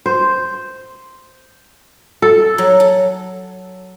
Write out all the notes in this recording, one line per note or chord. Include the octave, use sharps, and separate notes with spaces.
C5
A4
F#3
A4